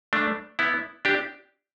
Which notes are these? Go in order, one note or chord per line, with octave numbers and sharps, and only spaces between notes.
A3 D4
B3 E4
D4 G4